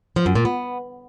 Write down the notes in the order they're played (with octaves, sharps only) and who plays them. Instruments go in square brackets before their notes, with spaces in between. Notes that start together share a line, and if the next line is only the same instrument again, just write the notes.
[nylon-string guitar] F3
F#2
A#2
B3